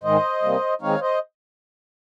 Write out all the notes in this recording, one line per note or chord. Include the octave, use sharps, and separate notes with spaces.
G#2 D#3 G#3 C5 D#5
C3 G3 A#3
D#3 G#3 C4 D#4 C#5 F5
C5 D#5